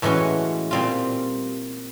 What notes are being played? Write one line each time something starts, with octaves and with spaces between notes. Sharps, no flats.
A2 E3 G#3 C#4 F#4
A#2 G3 C4 F4